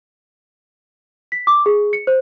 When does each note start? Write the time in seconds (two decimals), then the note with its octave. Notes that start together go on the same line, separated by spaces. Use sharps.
1.32 B6
1.47 D6
1.66 G#4
1.93 C#7
2.07 C5